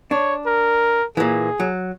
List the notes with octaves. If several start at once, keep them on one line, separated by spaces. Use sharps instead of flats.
D4 C#5
A#4
A#2 E3 G#4
F#3